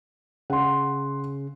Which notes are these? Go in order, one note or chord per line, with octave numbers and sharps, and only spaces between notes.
C#3 F#5 C6